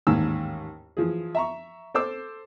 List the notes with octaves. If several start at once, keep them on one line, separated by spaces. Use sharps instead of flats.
A1 D#2 G#2 G#5 E6
E3 F3 G#4
E5 A#5 C#6
A4 C5 D6 E6